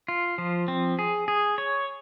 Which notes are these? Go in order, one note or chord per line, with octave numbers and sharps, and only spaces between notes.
F4
F3
C4
G#4
G#4
C#5